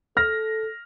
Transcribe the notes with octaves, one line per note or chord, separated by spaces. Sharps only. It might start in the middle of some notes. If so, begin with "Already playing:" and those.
A4 F6 A#6